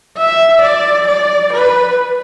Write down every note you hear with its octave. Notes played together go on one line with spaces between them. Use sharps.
E5
D5
D5
B4